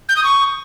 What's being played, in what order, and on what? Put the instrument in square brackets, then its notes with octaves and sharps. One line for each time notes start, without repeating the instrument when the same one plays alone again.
[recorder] G6
D#6
C#6